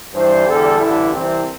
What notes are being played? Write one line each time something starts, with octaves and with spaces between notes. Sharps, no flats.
G2 E3 G3 C5
E2 D3 G3 A4
A1 G2 D3 G3 E4
C2 C3 E3 C4